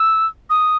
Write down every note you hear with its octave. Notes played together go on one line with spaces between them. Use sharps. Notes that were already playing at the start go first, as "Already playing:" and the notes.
Already playing: E6
D#6